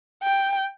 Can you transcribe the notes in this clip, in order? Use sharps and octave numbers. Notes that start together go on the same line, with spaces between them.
G5